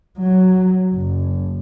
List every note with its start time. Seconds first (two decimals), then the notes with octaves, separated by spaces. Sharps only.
0.19 F#3
0.94 F#1